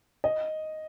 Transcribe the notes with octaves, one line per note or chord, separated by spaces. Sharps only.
D#5